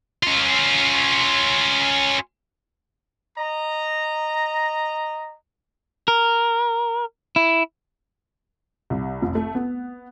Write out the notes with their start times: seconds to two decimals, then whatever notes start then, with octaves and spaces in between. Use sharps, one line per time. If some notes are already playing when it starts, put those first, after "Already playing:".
0.23 C#4 F4
3.38 D#5 A#5
6.08 A#4
7.36 E4
8.90 C2
9.22 F1
9.35 A3
9.55 B3